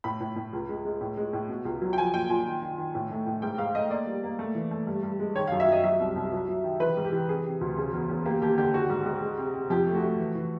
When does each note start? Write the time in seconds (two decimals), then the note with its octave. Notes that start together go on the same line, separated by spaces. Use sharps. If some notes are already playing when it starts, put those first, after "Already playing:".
0.04 A2 B5
0.20 A2
0.36 A2
0.53 C#2
0.69 G#3
0.85 G#3
1.01 A2
1.17 G#3
1.33 A2
1.49 B2
1.65 C#2
1.82 F#3
1.93 G5
1.97 F3 G#5
2.14 A#2 G5
2.29 A#2 G#5
2.45 D#3
2.62 D#3
2.78 D#3
2.95 A2
3.10 A3
3.27 A2
3.42 G#2 G5
3.58 G#2 F5
3.75 A3 D#5
3.90 A#3 D5
4.07 G3
4.23 A#3
4.39 A3
4.55 E3
4.71 A3
4.87 G2
5.03 G2
5.20 G#3
5.35 D#3 C#5
5.47 F5
5.52 F#2
5.60 E5
5.68 F#3 D#5
5.84 F#3 E5
6.00 C2
6.16 C2
6.32 F#3
6.49 F#3
6.64 D#3
6.80 E3 B4
6.97 G#2
7.05 G4
7.12 E3
7.28 C3 G#4
7.45 C3
7.61 D2
7.78 C#3
7.93 E2
8.10 E2
8.25 A#3 G4
8.41 D#2 G4
8.58 D3 G4
8.74 D#3 F#4
8.90 G#2
9.06 G#2
9.22 G#3
9.38 C3
9.54 C3
9.70 F2 G4
9.87 A3
9.95 F#4
10.02 A3
10.18 E3
10.35 E3